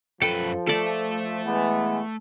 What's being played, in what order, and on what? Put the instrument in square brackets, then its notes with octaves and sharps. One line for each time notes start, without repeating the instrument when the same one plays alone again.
[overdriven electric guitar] F#2 B4 [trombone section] F3 [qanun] A4 G5 A5
[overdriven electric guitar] A3 E5 [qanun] A4 D5
[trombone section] E3 G#3 B3